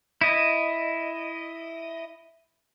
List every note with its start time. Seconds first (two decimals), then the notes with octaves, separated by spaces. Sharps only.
0.21 E4 D#5